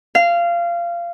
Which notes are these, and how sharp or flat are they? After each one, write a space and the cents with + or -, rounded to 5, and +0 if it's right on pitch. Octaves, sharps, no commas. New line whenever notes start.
F5 -20